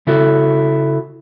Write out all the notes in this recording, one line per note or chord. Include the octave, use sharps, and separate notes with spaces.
C#3 E4 F#4 A4